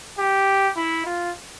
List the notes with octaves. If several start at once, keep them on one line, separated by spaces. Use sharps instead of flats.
G4
E4
F4